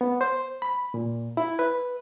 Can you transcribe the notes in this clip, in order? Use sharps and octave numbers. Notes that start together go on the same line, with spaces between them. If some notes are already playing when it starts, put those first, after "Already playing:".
B3
C5
B5
A#2
E4
B4